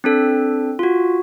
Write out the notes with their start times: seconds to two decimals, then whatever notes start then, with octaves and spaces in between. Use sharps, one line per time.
0.04 C4 D4 A4
0.79 F4 F#4